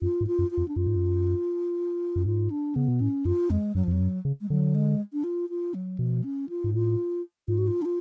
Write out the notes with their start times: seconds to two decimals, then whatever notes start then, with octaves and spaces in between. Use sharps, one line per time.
0.02 F#2 F4
0.21 G#2
0.27 F4
0.39 F#2
0.51 F4
0.57 F2
0.68 D4
0.76 F#2 F4
0.86 G#2
0.96 F#2
2.16 F#2
2.26 G#2 F4
2.50 D4
2.75 C#3 B3
2.88 B2
3.00 A2 C#4
3.25 F#2 F4
3.50 F2 G#3
3.75 F#2 F#3
3.84 F3
3.88 F2 F#3
4.01 F#2
4.25 C#3
4.41 G#3
4.50 D3 F#3
4.75 G#3
5.13 D4
5.24 F4
5.50 F4
5.74 F#3
5.98 B2 F3
6.24 C#4
6.49 F4
6.64 G#2
6.74 A2 F4
7.48 G#2 F4
7.58 F#4
7.68 F4
7.82 D4
7.85 F4